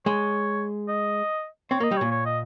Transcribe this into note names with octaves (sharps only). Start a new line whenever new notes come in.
G#3 C#5
D#5
C4 C#5
A#3
D#5
G3
A#2 C#5
C#5
D#5